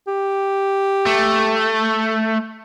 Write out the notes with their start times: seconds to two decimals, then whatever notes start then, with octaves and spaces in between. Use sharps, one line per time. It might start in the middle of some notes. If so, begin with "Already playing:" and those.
0.07 G4
1.06 A3